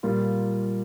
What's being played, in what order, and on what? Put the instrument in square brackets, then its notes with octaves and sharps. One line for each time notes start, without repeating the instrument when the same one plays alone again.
[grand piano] A#2 G3 A#3 F4